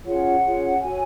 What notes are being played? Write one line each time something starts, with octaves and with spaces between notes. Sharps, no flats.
C#4 F4 G#4 C#5 F#5
C#4 F4 G#4 C#5
F#4 A4 C#5 G#5